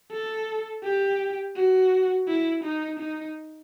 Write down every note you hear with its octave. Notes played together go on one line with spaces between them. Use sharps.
A4
G4
F#4
E4
D#4
D#4